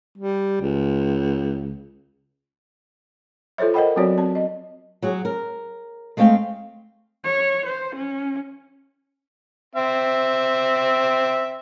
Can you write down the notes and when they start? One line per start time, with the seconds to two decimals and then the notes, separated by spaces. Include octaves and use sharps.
0.18 G3
0.61 C#2
3.58 F4 A4 C5 C#5 E5
3.74 A#4 C5 D#5 F#5 G5 B5
3.96 F#3 B3 C4 F#4 C#5 D5
4.18 C4 A5
4.35 D#5
5.02 F#3 F#4 G#4
5.25 A#4
6.17 G#3 A3 C4 F5 G5
7.24 C#5
7.67 C5
7.96 C#4
9.76 C4 E5